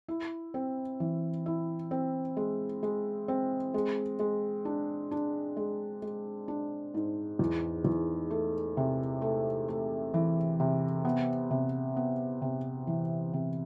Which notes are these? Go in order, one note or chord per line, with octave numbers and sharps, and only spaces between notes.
E4
C4
E3
E4
C4
G#3
G#3
C4
G#3
G#3
D4
D4
G#3
G#3
D4
G#2
E2
E2
A3
C3
A3
A3
E3
C3
B3
C3
B3
C3
E3
C3